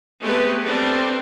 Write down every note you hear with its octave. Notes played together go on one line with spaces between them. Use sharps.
G#3 A3 B3 C4 G4 B4
G3 A3 C4 D4 B4